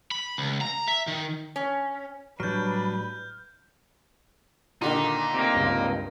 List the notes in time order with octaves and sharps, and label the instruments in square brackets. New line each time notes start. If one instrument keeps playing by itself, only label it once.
[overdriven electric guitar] B5
C#2
A#5
E5
D#3
[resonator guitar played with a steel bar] C#4
[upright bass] A2 [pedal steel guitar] F#3 G3 D4 [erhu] B4 [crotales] F6 G6
[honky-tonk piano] A#2 D3 D#3 [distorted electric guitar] D#4
[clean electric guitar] C3 A#3
[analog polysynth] C#2 G2